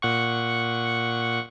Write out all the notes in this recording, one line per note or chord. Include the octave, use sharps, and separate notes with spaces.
A#2 F#5 C#6